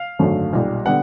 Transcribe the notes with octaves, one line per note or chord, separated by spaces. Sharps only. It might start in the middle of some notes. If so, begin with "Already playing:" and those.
Already playing: F5
G#1 F#2 D3 F#3 A3
B1 A#2 G3
D3 G3 B3 F#5